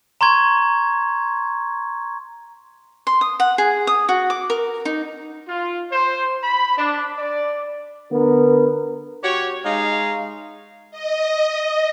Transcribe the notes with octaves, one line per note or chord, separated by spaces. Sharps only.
A#5 C6 C#6 G#6
C6
D#6
F#5
G#4
D#6
F#4
D6
A#4
D#4
F4
C5
B5
D4
D5
D3 B3 A#4
F#4 G4 C#5
G#3 D#4 C#5 F5
D#5